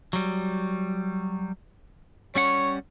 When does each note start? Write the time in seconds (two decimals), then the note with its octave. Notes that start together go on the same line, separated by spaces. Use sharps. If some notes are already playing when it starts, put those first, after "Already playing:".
0.13 F#3 G3
2.35 G3 C#4 C#5 F#5